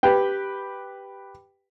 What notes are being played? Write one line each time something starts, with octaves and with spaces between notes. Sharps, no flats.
G4 B4 G5